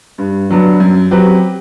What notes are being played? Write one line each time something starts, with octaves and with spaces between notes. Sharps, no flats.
G2
D3 F#3 B3 D4
F#2
F#3 C4 G4 B4